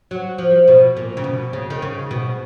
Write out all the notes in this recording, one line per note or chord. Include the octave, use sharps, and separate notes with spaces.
F#3
F3
B2
A#2
C#3
B2
C#3
D#3
C#3
B2